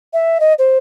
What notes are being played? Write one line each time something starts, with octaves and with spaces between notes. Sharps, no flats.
E5
D#5
C5